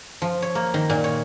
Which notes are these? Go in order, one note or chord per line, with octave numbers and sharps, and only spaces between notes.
F3
C#5
A#3
D#3
A#2
C#5